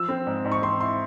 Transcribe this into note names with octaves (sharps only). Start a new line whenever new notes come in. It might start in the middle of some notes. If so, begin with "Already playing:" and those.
Already playing: F3 E6
C4
G#2
G#2
C#6
C4 C6
E4 C6